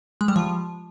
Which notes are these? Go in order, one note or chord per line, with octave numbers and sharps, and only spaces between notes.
G#3
G3
F3